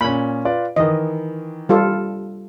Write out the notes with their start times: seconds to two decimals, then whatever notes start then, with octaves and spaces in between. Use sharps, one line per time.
0.01 A#2 C#4 B5
0.45 F4 B4 D5
0.76 D#3 E3 D#5
1.69 G3 F4 A4